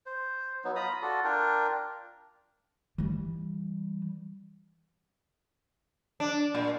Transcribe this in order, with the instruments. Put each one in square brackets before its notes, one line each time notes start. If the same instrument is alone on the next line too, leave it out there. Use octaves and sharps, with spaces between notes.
[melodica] C5
F#3 B3 D#4
F4 A#5 B5 D#6
F4 F#4 A4 D5
D4 F4 A#4 G5
[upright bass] E3 G3
[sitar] D4
A#2